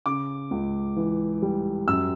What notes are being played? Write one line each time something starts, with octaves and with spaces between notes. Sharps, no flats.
C#3 D6
C#2
E3
G3
F#2 E6